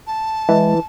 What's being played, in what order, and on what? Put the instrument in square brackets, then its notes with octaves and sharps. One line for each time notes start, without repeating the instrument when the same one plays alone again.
[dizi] A5
[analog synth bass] E3 [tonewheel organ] G#3